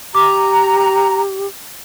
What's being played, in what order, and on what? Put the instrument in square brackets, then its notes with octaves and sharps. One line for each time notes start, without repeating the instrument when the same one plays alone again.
[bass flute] G4 [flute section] A#5 [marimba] D6